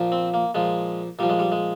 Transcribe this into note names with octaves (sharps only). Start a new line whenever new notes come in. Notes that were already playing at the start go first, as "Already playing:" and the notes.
Already playing: A#2 F3
C4
A#3
A#2 F3 G#3
A#2 F3 G3
G#3
G3
G#3